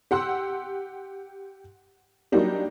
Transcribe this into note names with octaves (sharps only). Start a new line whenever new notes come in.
G4 F#5 C6 E6
F#3 G3 A#3 D4 D#4 G4